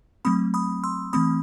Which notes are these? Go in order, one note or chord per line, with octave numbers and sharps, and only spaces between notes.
F#3 A3 C4 B5 D#6
B5 D#6
C6 E6
E3 A3 C4 B5 D#6